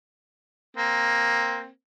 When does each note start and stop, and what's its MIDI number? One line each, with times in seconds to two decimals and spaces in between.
0.77 1.68 58
0.77 1.68 60